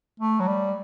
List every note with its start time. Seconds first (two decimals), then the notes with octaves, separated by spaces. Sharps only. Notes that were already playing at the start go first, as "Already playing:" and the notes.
0.20 A3
0.40 F#3
0.47 G3